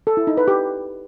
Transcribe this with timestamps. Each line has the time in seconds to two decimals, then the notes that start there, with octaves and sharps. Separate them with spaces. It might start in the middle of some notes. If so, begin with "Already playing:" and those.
0.07 A4
0.17 E4
0.27 D#4
0.37 B4
0.48 G4